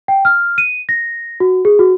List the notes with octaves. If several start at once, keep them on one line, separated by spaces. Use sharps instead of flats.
G5
F6
D#7
A#6
F#4
G#4
F#4